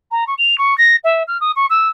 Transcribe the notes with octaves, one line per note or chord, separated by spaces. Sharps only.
A#5
C#6
F7
C#6
A#6
E5
F6
D#6
C#6
E6